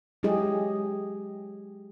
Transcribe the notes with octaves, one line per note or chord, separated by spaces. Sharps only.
F#3 G#3 E4 G4 G#4 D#5